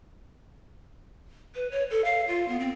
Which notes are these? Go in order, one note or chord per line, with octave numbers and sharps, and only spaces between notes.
B4
C#5
A4
F5
F4
B3
C4